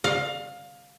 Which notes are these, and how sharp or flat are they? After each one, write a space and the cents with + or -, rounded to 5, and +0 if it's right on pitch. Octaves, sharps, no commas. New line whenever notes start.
F5 +20